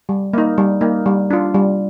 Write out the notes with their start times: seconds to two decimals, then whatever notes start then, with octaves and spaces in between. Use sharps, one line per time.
0.09 G3
0.33 A#3 D#4
0.58 G3
0.81 A#3 D#4
1.06 G3
1.30 D4 F4
1.54 G3